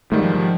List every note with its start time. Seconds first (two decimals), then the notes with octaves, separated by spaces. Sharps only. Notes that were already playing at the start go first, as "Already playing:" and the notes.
0.11 G#2 D#3 G3 A3
0.22 F3
0.35 F3